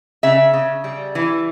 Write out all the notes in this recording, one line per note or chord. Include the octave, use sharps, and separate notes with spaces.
C#3 E5
C#3
G3
E3